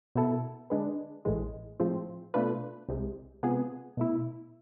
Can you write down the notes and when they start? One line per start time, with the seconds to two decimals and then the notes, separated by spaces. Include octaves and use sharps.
0.15 B2 B3 E4 A4
0.70 D3 G#3 D4 G#4 B4
1.25 A1 A2 E3 G#3
1.80 A2 F3 G#3 C4 F4
2.34 B2 A3 D4 F4 B4
2.89 C2 C3 G#3
3.43 C3 G#3 B3 F4 G#4
3.97 B2 A3 E4